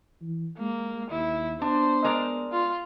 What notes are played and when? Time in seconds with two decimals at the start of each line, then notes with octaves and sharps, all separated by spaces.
0.21 E3
0.59 G#3 A#3
1.10 D#2 E4
1.62 B3 D4 C5
2.04 G#3 A#4 D5
2.52 F4